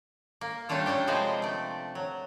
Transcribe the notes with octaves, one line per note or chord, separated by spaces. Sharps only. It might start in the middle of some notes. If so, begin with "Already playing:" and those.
A#3
G3 A3 C#4 D4 F4 A4
G3 C#4 D4 G4
C3 F3 G#3 F4 B4 C5
A3 D5
F#3